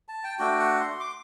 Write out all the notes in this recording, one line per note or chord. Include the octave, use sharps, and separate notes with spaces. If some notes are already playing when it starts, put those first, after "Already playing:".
A5
G5
A3 D4 F#4 G5
F#5
C6
D6